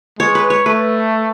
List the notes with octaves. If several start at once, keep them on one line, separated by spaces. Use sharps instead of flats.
G#3 C#5
B4
C#5
A3 B4